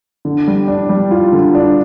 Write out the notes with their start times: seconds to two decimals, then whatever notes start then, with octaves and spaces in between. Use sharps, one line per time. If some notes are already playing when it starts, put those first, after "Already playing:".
0.25 D3
0.48 G3
0.68 D4
0.89 G3
1.11 F4
1.33 D3
1.55 D4